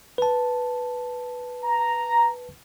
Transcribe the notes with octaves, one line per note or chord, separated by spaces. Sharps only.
B4 A5
A#5